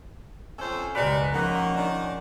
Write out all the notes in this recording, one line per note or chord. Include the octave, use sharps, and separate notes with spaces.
F2 C#4 A4 C5
F#1 C#2 G#3 F#4 G4 A#4 B4 D5
D#3 F3 A#3 C#4 D#5 F#5 A#5
D#3 D4